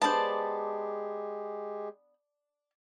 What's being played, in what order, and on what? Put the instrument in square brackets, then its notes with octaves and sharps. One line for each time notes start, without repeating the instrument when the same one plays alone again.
[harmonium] G#3 G4 G#4 [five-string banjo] B3 D4 C5 [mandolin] D5 A5